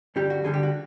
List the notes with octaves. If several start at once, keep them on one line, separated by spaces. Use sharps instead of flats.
G2 D3 G3 G4
F#4
G2 D3 G3 G#4
G4
F#4